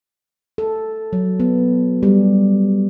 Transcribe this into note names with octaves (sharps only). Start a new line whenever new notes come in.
A4
F#3
B3
G3